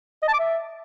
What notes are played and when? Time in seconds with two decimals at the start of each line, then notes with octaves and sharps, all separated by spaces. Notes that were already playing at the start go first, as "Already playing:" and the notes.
0.23 D#5
0.28 A5
0.34 D6
0.39 E5